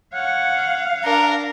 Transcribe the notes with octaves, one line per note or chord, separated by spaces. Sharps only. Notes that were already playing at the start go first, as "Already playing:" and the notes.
C#5 F5 F#5
D4 A#4